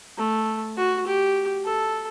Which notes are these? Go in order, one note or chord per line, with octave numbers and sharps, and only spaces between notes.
A3
F#4
G4
A4